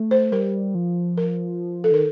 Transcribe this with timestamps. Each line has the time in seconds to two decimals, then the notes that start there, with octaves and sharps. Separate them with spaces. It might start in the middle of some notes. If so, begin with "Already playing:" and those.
Already playing: A3
0.11 C5
0.32 G3 A#4
0.75 F3
1.18 A#4
1.84 A4
1.91 D#3 A#4